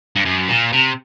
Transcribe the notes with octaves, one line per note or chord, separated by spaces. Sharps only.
G2
F#2
A#2
C3